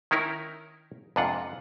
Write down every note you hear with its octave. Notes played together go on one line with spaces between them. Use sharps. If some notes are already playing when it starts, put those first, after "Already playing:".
D#3 C#4 D#4 E4 A#4
F2 G#2 C3 D4 F4 F#5